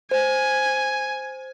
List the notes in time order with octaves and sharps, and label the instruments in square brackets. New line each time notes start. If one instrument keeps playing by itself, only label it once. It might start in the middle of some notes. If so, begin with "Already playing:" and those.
[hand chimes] C5 [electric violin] G#5